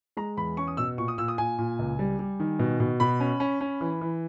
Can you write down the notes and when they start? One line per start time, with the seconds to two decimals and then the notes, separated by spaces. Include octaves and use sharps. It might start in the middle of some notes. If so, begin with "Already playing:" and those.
0.17 G#3 A#5
0.37 E2 B5
0.57 C#4 C#6
0.67 D#6
0.77 B2 E6
0.98 A#2 C#6
1.08 D#6
1.18 A#2 E6
1.28 D#6
1.38 A#2 G#5
1.58 A#2
1.79 C#2
1.99 G3
2.19 G3
2.40 D#3
2.59 B2
2.80 B2
3.00 B2 B5
3.20 C#4
3.40 C#4
3.61 C#4
3.81 E3
4.01 E3